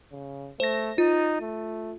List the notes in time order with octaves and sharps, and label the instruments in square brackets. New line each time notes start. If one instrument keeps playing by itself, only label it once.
[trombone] C#3
[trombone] A3 [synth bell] C5 A#6
[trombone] D#4 [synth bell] F4
[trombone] A3